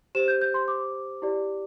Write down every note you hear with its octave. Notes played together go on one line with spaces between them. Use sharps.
G4 C5 E7
G6
G6
C6
D6
E4 G4 D5